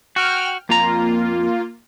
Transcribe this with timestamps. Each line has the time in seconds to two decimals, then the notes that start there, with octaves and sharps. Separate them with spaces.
0.16 F#4 G5 F6
0.69 F2 A#3 F4 A#5